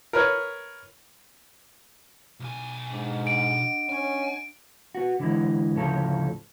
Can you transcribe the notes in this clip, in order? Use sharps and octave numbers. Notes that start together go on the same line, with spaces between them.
A#4 B4 C#5
B1 G#5
G#2 D4
D4 D#5 F#5 D7
C#4 G#5
B3 F#4
D3 E3 G#3
D2 A2 C#3 F3 A4